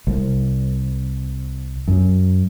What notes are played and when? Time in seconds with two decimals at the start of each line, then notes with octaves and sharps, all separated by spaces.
0.07 C2
1.88 F#2